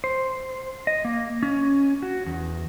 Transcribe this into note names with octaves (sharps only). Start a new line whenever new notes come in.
C5
D#5
A#3
C#4
F#4
E2